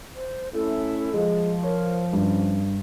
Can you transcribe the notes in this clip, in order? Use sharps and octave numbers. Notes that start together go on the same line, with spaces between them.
C5
A3 C#4 E4 A4
F3 G#3
A#4 C#5
G2 C#4